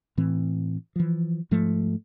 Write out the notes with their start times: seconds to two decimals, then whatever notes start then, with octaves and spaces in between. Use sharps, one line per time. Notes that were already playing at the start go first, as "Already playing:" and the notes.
0.17 A2 E3 C4
0.96 E3 F3
1.51 G#2 F3 A3